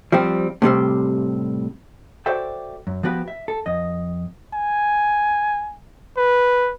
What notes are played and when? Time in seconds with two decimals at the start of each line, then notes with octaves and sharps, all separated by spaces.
0.12 F3 G3 C4
0.62 A2 C3 G3 C4
2.26 F#4 A4 C5 D5 E5 G5
2.87 F#2
3.03 F3 B3 F#4 G4 B4
3.28 E5
3.48 A4
3.66 F2 D#5
4.54 G#5
6.17 B4